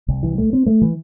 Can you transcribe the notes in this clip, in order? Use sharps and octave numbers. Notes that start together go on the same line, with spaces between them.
C2
E3
A3
C4
A3
E3